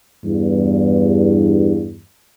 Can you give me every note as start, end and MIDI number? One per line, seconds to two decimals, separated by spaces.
0.24 2.01 40
0.24 2.01 43